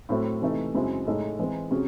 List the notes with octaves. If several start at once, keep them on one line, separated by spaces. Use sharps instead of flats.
A2 F#3 A3 C4 E4
C3 E3 A3 D#4
F#2 C#3 G#3 C4 E4
A2 G#3 D#4 A4
E3 G#3 C4
C3 F#3 C#4 G#4